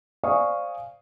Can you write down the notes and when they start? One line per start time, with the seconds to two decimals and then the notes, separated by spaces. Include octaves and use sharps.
0.23 C5 D5 F5 G#5 C#6 D#6